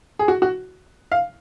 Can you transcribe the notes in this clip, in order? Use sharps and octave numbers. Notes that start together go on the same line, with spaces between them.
G#4
F#4
F#4
F5